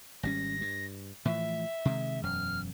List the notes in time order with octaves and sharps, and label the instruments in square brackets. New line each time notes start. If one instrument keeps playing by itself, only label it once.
[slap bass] G#1 G3 C#4 [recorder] A#6
[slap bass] G2
[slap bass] A2 E3 F3 [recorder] E5
[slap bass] C3 D#3 G#3
[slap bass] E1 F#2 [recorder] F6